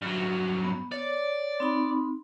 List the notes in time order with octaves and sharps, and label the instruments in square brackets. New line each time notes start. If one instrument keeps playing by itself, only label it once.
[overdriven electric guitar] G2 F#3
[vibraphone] B3
[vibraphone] C#5 [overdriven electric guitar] D5
[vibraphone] C4 D#4 B5